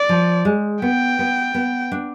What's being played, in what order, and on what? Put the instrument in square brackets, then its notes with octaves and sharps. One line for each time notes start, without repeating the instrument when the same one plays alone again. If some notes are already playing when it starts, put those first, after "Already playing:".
Already playing: [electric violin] D5
[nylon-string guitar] F3
G#3
[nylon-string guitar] B3 [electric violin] G5
[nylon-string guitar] B3
B3
D4